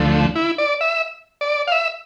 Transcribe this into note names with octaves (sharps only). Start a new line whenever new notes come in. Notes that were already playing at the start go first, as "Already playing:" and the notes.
Already playing: D2 D3 F3 A3
E4
D5
E5
D5
F5
E5